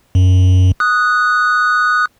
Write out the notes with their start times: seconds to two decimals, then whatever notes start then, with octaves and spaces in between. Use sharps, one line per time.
0.15 F#2
0.80 D#6 F#6